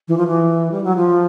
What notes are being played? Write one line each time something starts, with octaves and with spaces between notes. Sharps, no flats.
E3
F3
E3
G3
F#3
F3